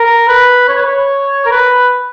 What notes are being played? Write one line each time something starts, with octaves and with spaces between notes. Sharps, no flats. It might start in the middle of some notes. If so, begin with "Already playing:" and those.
Already playing: A#4
B4
C#5
B4
C#5
A#4
B4